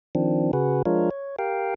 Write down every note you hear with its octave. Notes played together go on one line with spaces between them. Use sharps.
D#3 F3 C4 D4
C#3 F#4 G#4 B4
F3 G#3 D4 F4 A#4 C#5
C#5
G4 A#4 F5 G5